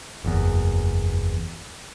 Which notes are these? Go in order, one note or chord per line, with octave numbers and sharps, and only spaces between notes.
F#1 E2